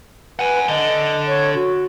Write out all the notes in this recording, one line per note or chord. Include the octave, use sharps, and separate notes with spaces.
B4 F#5 G#5
D3 D#5
C#5
F#4